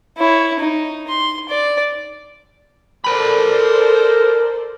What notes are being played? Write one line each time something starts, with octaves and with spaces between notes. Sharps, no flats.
E4 C#5
D#4
C6
D5
A4 A#4 C5 D5 B5